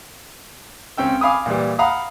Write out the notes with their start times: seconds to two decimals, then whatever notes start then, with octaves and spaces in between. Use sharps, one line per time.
0.98 C#2 C4 C#4 G5 E6
1.21 F5 G#5 B5 D6 D#6
1.46 A#2 E3 G3
1.79 F5 F#5 A#5 B5 D#6